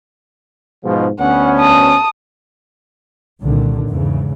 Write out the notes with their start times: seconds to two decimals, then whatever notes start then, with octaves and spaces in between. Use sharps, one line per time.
0.85 G#2 B2 F3
1.20 D2 B3 C#4 F#5
1.58 A5 D#6
3.41 C2 A#2 D3 D#3
3.88 E2 G#2 C#3 E3